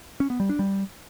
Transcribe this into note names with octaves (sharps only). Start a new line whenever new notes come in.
C#4
B3
G3
D4
G3